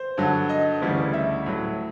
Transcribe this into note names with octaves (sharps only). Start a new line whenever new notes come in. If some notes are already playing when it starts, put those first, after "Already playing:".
Already playing: C5
G2 D3 F#3
D#5
D2 C#3 E3 G3
E5
A2 F#3